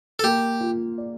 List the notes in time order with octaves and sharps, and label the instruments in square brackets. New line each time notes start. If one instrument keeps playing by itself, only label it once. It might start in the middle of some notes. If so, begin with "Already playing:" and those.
[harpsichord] A4
[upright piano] A#3 [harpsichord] G4
[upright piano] F4
D5